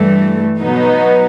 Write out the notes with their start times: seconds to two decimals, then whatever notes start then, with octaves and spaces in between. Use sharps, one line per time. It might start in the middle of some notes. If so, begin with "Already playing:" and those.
Already playing: G2 E3 A3
0.59 B2 F#3 B3 D#4